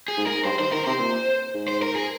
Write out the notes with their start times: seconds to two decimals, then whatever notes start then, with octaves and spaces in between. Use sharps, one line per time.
0.08 G#4
0.17 G#2
0.27 A#4
0.44 G2 C5
0.59 D#3 C5
0.72 D#3 A#4
0.86 C3 C5
0.99 A#2
1.54 G#2
1.68 C5
1.82 A#4
1.96 G#4